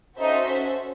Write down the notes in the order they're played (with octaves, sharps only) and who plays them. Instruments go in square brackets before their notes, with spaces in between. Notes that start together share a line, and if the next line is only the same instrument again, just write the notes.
[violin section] C#4 F#4 A4 C5 E5 [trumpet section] D#4